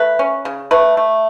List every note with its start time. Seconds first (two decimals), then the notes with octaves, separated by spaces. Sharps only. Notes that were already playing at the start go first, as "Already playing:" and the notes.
Already playing: A3 B4
0.19 C#4
0.45 C#3
0.71 A3 B4
0.97 A3